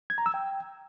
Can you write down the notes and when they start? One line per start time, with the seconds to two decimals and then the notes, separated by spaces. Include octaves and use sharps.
0.10 G#6
0.18 A#5
0.26 E6
0.34 G5